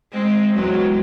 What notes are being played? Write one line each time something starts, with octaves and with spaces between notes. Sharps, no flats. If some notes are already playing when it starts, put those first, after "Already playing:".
G#3 C4
E2 F#3 G#3